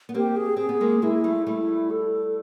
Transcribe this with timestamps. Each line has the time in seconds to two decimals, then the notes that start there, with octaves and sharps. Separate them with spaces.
0.09 B3
0.14 A#3 C4 G4
0.36 G#4
0.56 C4 G#4
0.69 B3
0.81 G#3 A#3
1.02 G#3 A#3 E4
1.24 G3 A3
1.47 G3 A3 E4
1.91 A4